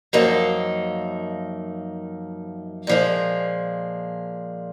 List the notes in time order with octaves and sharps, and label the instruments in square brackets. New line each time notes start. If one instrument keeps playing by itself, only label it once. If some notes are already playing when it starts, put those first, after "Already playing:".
[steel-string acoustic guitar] F#2 F3 A#3 D#4
A#2 F3 G#3